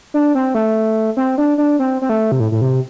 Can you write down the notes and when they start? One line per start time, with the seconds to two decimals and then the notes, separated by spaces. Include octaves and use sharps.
0.14 D4
0.35 C4
0.55 A3
1.17 C4
1.38 D4
1.58 D4
1.79 C4
2.02 C4
2.09 A3
2.32 C3
2.40 A2
2.52 A2
2.61 C3